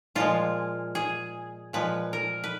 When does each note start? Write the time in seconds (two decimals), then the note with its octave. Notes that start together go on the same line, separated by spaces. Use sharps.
0.15 A#2 F3 G#3 F4
0.95 G#4
1.73 A#2 F3 G#3 B4
2.13 A#4
2.44 B4